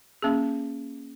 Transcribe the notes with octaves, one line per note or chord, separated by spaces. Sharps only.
A#3 C#4 G#4